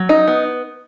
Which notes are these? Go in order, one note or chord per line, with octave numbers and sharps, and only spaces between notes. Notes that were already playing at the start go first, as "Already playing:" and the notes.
Already playing: F#3
D#4
B3